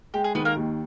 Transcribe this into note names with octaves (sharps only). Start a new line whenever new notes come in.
G#3 G4
G#4
D#3 B3 B4
A#3 A#4
D#2